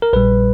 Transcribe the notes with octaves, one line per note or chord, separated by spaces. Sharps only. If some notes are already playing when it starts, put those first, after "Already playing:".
A#4
A#1 A#2 G3 B4